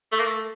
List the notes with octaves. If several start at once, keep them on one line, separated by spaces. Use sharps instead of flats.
A3
A#3
A3